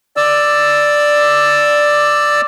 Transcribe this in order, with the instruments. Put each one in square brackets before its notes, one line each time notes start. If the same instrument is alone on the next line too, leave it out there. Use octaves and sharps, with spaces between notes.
[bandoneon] D5 E6